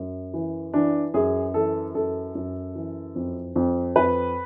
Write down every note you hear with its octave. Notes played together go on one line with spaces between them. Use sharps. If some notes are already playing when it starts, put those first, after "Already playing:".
Already playing: F#2
E3
E3 D4
F#2 G#4
E3 A4
F#2 A4
F#2
E3
F2
F2
F2 B4